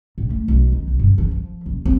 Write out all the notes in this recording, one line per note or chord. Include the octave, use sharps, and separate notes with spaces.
A2
A3
B1
D#3
B1
G2
E3
F3
D#1
C4